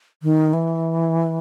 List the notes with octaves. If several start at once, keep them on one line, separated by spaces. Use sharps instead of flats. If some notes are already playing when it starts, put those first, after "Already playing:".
D#3
E3